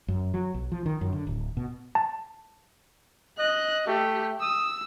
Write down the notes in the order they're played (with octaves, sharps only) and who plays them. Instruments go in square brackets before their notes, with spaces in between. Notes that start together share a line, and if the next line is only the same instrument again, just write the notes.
[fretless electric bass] F#2
F#3
B1
F3
D#3
F#2
D3
D1
B2
[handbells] A5
[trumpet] D#5 [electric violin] F#6
[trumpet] A3 [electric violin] G4
[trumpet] D#6 [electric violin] E6